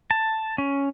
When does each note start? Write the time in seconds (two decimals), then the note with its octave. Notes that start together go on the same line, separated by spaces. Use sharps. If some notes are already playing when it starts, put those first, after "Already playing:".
0.11 A5
0.58 C#4